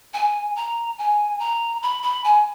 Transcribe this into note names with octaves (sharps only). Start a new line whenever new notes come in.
G#5
A#5
G#5
A#5
B5
B5
G#5